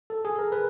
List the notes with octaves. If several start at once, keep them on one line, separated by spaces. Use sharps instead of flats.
A4
G#4
A#4
B4